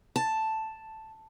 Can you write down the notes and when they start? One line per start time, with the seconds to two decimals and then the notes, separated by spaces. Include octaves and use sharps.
0.16 A5